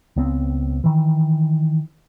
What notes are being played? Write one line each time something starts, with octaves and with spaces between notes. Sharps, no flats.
C#2 B3 C4
D#3 E3